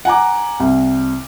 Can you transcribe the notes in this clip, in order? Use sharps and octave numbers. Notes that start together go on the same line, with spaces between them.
F#5 G#5 A#5 D6
C2